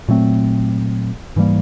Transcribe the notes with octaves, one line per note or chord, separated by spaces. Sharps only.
A#2 F#3 A3 C4
G#2 E3 G3 A#3